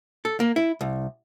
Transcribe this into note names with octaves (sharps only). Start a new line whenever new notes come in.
A4
A#3
E4
C2